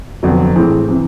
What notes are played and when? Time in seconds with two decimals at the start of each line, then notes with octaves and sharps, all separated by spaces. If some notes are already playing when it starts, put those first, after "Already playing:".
0.23 F1 F2 D3 F#3 B3
0.55 A2 E3 G#3 C4
0.88 C3 E3